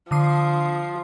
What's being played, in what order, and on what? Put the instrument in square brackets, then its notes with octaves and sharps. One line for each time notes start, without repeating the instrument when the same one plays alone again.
[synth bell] D3 D#6 C7 [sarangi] F3